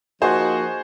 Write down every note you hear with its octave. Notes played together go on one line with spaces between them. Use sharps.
F3 A#3 D#4 F#4 G#4 C5